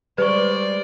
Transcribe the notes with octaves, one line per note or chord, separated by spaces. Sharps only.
G3 G#3 B4 C5 D5 C#6